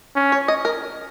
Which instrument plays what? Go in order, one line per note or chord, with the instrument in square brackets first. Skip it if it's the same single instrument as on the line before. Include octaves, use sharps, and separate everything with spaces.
[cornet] C#4
[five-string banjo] C#5
D#5
A#4